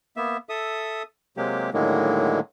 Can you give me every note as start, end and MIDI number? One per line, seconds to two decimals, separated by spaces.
0.17 0.37 58
0.17 0.37 59
0.17 0.37 76
0.49 1.03 69
0.49 1.03 76
0.49 1.03 87
1.37 1.70 48
1.37 1.70 54
1.37 1.70 56
1.37 1.70 58
1.37 1.70 67
1.74 2.40 45
1.74 2.40 50
1.74 2.40 51
1.74 2.40 54
1.74 2.40 56
1.74 2.40 58